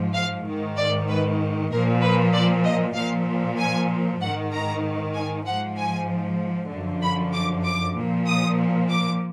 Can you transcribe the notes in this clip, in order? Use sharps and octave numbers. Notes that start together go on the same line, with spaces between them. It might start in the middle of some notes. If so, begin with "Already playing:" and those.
Already playing: G#2 F3
F5
G#2 D#3
D5
B4
A#2 F3 A#4
B4
D5
D#5
A#2 F3 F5
G#5
G#2 D#3 F#5
A#5
G#5
G#2 F3 F#5
G#5
F#2 D3 F3
B5
D6
D6
A#2 F3
D#6
D6